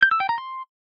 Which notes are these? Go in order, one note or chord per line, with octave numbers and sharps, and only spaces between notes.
G6
E6
G5
A#5
C6